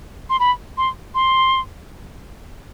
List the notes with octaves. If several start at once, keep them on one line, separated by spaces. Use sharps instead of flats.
C6
B5
C6
C6